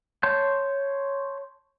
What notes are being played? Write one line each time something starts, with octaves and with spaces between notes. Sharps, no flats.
C#5 A5 C6 G6